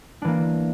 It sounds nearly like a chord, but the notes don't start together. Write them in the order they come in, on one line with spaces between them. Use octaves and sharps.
D4 E3 A#3